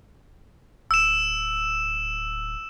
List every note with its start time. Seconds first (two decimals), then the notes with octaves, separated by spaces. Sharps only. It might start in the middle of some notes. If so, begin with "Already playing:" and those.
0.91 D1 E6 E7